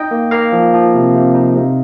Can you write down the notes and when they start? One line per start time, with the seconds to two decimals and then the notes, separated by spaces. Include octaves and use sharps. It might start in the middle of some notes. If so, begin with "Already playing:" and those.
Already playing: D#4 D#5 G5
0.11 A#3
0.31 A#3 F5 A#5
0.52 F3
0.73 F3
0.94 C3
1.15 C3
1.35 D#4
1.56 C3